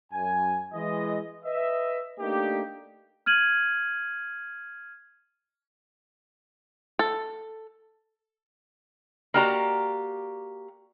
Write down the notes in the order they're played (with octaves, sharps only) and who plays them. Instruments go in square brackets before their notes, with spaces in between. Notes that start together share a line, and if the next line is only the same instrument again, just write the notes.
[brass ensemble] F#2 G#5
E3 G#3 D#5
B4 D#5 E5
A3 A#3 D4 D#4 G4
[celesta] F6 G#6 D#7 F#7
[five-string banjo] A4
[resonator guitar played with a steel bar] A#3 F#4 G4 D5 A#5